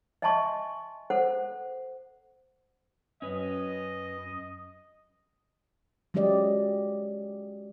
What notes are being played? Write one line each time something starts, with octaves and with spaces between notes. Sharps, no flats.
D#5 E5 G#5 A5 C6 C#6
A4 C5 F#5
F#2 C#4 B4 D#5
F#3 G#3 C#4 G4 D5 D#5